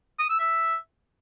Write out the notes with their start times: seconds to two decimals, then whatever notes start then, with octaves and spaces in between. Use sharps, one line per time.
0.19 D#6
0.29 E6
0.39 E5